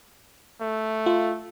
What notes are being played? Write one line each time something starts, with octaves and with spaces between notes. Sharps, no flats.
A3
F4